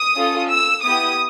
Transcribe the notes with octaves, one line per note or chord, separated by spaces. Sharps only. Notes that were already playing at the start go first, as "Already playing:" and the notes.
Already playing: D#6
C#4 F4 A4
E6
B3 E4 G4 D#6